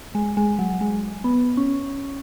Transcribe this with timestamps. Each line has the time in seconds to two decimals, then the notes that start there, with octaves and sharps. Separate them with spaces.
0.15 G#3
0.37 G#3
0.59 F#3
0.81 G#3
1.24 B3
1.57 C#4